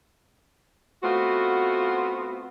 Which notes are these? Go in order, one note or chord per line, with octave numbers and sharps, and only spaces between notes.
A3 B3 C4 F4 F#4